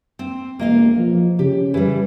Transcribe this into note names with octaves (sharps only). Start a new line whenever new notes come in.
C4
E1 A#3 D#5 F5
F3
C#3 G4
E3 G3